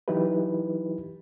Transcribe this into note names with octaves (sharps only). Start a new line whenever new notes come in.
E3 F#3 D#4 E4 G4 B4